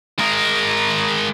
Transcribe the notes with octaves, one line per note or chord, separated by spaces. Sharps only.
G#3 A#4